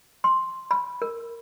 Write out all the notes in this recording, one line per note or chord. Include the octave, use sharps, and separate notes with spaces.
C6
B5
A#4